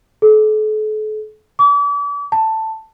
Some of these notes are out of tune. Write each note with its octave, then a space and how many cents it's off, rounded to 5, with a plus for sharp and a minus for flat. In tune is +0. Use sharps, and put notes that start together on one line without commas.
A4 -40
D6 -40
A5 +10